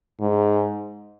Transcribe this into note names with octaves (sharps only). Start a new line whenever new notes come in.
G#2